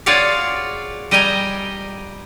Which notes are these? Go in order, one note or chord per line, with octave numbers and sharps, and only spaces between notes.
F4 F#4 G#4 C#5 D5 F5
G3 D#5 G5 G#5 A#5